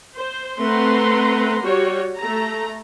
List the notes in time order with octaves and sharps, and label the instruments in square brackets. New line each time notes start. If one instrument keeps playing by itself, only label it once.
[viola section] C5
A3 C4 B4 F#5 A#5 C6
G3 F#4 C#5
A3 A#5